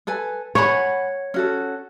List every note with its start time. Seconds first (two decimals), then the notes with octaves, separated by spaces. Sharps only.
0.07 A4 B4 G#5
0.55 C#5 F#5 G#5 B5
1.34 C#4 F#4 A4